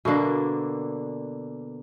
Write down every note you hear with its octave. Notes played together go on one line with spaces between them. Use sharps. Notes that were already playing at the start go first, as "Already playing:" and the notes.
B2 D3 A#3 D4